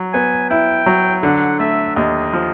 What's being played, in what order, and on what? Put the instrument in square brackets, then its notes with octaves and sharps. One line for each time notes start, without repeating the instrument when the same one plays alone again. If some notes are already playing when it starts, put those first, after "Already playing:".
Already playing: [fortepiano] F#3
[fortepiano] B3 [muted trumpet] G#5
[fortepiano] E4 [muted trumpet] G5
[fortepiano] F#3
[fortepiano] D3 [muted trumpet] F#5
[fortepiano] A3 [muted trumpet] E5
[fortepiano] D#2 [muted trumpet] D#5
[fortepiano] F3